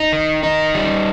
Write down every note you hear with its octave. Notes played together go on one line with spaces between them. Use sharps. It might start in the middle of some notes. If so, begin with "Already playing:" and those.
Already playing: D#4
D#3
D#4
G3